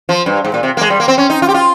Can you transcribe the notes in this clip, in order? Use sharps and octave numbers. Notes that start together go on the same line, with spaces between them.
F3
G2
G#2
A#2
C3
A#3
G#3
G3
A#3
C4
C#4
D#4
F4
G4
F4